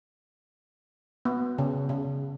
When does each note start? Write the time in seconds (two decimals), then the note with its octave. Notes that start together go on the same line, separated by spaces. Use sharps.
1.25 B3
1.58 C#3
1.89 C#3